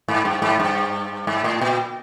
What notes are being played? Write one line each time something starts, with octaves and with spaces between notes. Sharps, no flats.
G#2
G2
G#2
G2
G#2
A2
A#2